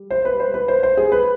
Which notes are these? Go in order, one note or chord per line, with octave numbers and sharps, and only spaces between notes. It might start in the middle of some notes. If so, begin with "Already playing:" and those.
Already playing: G3
C5
B4
C5
B4
C5
C5
G#4
B4